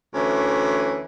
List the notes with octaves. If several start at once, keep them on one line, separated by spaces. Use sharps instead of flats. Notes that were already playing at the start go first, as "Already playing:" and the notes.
D2 E3 C#4